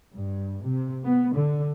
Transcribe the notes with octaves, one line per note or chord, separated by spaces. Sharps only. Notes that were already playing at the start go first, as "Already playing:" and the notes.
G2
C3
B3
D3